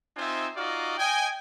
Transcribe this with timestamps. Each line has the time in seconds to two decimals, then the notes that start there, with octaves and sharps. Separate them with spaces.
0.17 C4 D#4 F4 C5 E5 G#5
0.57 D#4 F4 F#4 D5 D#5 F5
0.98 D#5 G5 G#5